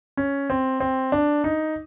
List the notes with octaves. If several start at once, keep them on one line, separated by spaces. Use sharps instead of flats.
C#4
C4
C4
D4
D#4